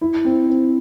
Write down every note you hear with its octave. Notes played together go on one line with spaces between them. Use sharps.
E4
C4
C4